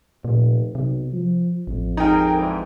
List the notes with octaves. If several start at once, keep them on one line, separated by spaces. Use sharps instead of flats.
F1 A#2
B1 C3
F3
A1 F2
D#4 G#4 A#4 G5
G#2 D3 E3